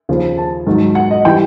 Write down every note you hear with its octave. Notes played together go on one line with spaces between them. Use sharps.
D#2 C#3 F3
A5
G#2 D#3 F#3
F#5
D#5
E3 G3 G5